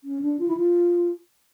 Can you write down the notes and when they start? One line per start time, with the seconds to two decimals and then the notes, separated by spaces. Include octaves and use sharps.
0.04 C#4
0.22 D4
0.39 F4
0.48 E4
0.57 F4